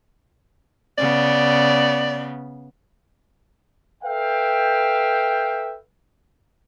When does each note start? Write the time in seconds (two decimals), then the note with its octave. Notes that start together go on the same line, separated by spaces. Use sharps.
0.98 C#3 B3 D5
4.04 A4 B4 E5 F5 G5